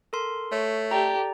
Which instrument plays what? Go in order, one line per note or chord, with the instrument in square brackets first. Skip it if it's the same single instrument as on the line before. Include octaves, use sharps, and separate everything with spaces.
[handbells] A4 A#4 C6
[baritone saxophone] A3 [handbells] C#5
[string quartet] G4 A4 [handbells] D5 A#5